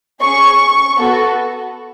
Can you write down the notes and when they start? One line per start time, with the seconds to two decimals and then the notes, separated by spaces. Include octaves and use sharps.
0.21 C#4 G#4 C#6
0.99 B3 F#4 A4